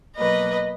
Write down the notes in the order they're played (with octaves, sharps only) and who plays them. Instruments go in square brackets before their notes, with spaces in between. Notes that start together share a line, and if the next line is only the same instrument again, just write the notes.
[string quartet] B2 F#3 A#3 B4 D#5